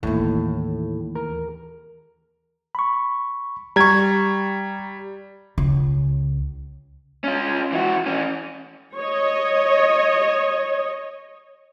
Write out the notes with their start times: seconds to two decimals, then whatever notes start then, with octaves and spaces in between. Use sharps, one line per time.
0.03 D#2 A2 E3
1.15 A#4
2.75 B5 C#6
3.76 G3 A#5 C#6 G#6
5.58 C#2
7.24 C#4 F4
7.73 E3 F#4
8.06 E3 C#4
8.97 C#5 D#5